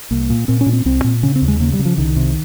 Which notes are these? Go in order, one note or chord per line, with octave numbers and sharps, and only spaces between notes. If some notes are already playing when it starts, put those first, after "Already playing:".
C2 A#3
A#2
A#2 C4
C#4
A#2
C4
C2 C4
A#2
C#3 C#4
C4
D#2
G#3
C#3 A#3
G3
C#3
F3
C2 D#3
C3